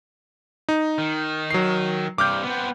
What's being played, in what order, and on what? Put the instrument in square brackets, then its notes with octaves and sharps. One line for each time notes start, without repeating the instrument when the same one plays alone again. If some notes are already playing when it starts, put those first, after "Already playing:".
[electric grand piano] D#4
[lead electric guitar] D#3
[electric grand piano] F#3 C7
[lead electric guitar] G2 C3 [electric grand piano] D6 F6 G6
[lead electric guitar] B3 C4